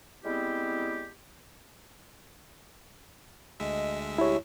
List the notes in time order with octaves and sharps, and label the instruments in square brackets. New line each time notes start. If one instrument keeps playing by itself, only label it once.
[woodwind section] G3 G#3 B3 C4 E4 G4
[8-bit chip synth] D2 G#3 E5 [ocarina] D#5
[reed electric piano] E4 C#5 [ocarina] G4